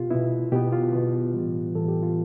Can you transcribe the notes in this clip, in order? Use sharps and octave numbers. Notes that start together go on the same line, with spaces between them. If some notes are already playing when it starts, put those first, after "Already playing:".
Already playing: B2 B3 F4 G4
B2 B3 E4
B2 B3 G4
F4
B2 B3
A2 E3 G3 B3
A2 E3 G3 B3 A4
G4
F4